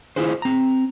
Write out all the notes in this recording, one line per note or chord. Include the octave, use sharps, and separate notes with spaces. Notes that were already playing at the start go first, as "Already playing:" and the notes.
E4 F4 G#4 C5
C4 A#5